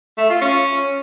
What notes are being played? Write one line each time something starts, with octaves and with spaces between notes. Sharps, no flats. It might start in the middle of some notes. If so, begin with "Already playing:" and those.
A3
F4
C#4